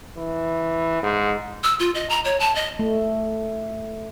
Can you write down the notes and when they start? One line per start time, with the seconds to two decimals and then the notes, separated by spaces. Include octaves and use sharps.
0.17 E3
1.03 G#2
1.64 E6
1.79 F4
1.95 D#5
2.10 A#5
2.25 C#5
2.40 A5
2.55 D#5
2.79 A3